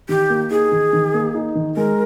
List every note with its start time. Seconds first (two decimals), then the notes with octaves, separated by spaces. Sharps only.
0.09 D#3 G4
0.30 A#3
0.51 D#4 G#4
0.71 D#3
0.93 D#3
1.14 A#3
1.34 D#4
1.55 D#3
1.77 G#3 A#4